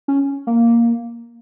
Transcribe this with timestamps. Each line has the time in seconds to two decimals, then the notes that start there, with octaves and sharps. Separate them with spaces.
0.08 C#4
0.47 A#3